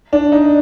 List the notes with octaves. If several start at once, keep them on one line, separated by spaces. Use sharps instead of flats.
D4
D#4